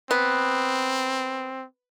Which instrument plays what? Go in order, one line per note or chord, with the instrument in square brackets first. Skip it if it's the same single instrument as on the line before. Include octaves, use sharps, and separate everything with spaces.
[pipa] B3 [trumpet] C4